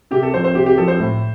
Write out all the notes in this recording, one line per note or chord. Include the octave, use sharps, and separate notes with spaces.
C3 G4
A4
F3 C4 C5
C5
C3 G4
G4
F3 C4 A4
C5
A2